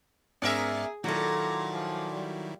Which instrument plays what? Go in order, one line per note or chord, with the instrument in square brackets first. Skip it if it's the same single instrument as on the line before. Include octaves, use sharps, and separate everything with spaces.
[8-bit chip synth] G#2 D5 [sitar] B3 A#4 E5 [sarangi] G#4
[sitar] A#2 [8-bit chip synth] D#3 F#3 E4 [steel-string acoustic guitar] F#4 A4 [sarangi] A#5
[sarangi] F3
G3